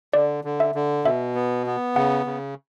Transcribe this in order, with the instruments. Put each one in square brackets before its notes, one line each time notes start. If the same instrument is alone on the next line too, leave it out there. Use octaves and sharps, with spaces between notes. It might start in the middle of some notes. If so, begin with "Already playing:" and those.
[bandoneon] D3 [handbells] D5
[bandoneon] D3
[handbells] E5
[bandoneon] D3
[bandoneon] B2 [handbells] E5
[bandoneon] B3
B3
[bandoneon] C#3 [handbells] F#5
[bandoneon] C#3